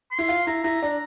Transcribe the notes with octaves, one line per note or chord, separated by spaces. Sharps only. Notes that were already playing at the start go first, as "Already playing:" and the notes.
C6
E4
F4
E4 A#5
E4 A#5
D4 A#5